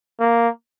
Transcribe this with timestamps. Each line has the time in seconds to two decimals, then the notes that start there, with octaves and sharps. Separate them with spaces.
0.20 A#3